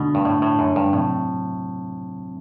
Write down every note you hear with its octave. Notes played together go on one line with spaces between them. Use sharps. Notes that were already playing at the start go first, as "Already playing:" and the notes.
Already playing: B2 D3 A3 D4
G2
A2
A2
F#2
G2
A2 C3 F#3 C4